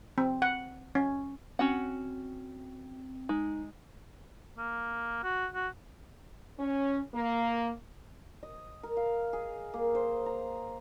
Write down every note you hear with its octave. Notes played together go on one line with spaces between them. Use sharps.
C4
F#5
C#4
C4 C#4 F#4 F#5
G#3 D#4
A#3
F#4
F#4
C#4
A#3
D#5
A#4
F5
G#4
A#3
C5
A#5